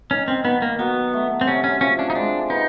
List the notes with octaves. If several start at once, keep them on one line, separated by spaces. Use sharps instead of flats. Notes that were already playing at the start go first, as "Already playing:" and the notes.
D#3 C#4
C4
D#3 B3
A#3
F#3 B3
A3
C4
C3 C#4
C#4
F3 C#4
D4
D#4
G#3 D4
B3 D#4